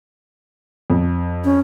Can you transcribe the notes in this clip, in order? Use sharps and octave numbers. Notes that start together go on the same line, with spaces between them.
F2
C#4